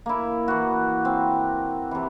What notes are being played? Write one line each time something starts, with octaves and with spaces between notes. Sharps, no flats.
A#3 E4
E3 F#4
C4
C3 E3